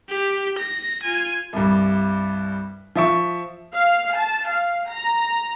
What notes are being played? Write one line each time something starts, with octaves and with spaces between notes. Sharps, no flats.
G4
A#6
F4 G#5
C2 G2
F3 E5 C#6
F5
A5
F5
A#5